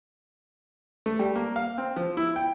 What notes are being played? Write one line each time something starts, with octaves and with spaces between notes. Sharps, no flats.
A3
G3
A#3
F5
C4
F3
E4
G5